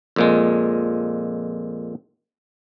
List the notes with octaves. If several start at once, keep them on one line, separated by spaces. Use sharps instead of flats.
F2 A#2 G#3